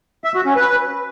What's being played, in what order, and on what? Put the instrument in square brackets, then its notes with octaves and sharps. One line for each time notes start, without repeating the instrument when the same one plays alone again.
[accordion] E5
F#4
C#4
B4